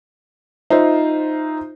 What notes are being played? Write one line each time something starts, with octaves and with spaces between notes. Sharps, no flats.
D#4 F4 C5 E5